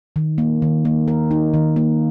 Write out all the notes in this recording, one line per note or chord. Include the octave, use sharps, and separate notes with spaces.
D#3
A#3
D#3
A#3
A#4
D#4
D#3
A#3